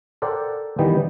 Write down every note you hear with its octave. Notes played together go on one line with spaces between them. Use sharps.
A4 A#4 C5 D5 F#5 G5
D#3 E3 G3 B3 G5